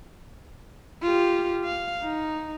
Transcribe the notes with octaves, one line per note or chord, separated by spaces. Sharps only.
F4 G4
F5
D#4